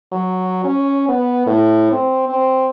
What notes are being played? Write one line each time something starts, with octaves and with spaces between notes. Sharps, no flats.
F#3
C#4
B3
A2
C4
C4